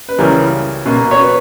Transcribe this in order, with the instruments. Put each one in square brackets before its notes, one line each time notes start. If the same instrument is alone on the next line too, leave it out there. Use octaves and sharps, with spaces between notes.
[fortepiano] B4
C#2 C#3 E3 G3 A#4
B2 A#3
C#5
B4